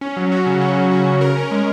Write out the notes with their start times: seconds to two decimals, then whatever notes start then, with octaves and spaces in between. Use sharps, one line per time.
0.01 C#4
0.17 F#3
0.32 F#4
0.46 C#3
0.61 C#4
0.76 F#3
0.91 F#4
1.06 C#3
1.21 A#4
1.36 C#4
1.51 G#3